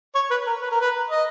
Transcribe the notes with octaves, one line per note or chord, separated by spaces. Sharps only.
C#5
B4
A#4
B4
A#4
B4
D#5